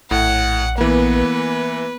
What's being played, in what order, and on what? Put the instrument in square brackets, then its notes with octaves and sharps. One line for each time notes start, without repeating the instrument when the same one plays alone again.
[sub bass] A#1 [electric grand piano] A2 [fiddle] F#5
[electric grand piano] E3 A#3 [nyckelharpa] B3 [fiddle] B4